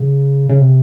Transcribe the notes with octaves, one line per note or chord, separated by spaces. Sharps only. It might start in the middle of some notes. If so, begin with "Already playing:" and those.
Already playing: C#3
C#3
C3